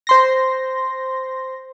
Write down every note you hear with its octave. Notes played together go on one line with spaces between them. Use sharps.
C5 C6 A#6